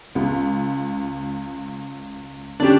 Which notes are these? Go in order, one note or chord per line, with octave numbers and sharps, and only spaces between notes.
C#2
F1 D3 C#4 D4 G4 D5